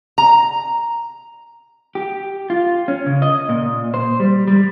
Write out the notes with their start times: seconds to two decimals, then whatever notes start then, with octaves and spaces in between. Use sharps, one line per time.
0.18 A#5
1.95 G4
2.50 F4
2.88 C#4
3.06 C#3
3.22 D#5
3.49 A#2
3.94 C5
4.20 G3
4.47 G3